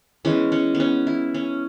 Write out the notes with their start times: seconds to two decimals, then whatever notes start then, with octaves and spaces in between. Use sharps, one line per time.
0.25 E3 G#3 B3 C#4
0.52 C#4
0.75 B3
0.80 C#4
1.07 E4
1.34 C#4